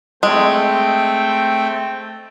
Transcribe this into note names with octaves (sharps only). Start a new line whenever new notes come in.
G#3 A3 C4 G5